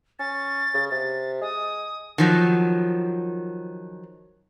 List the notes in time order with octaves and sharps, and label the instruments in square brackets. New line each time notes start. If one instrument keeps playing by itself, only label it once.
[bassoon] C#4 [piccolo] A6
[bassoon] C#3
[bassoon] C3 [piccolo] A6
[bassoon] G#3 [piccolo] D#6
[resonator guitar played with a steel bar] D#3 F3 F#3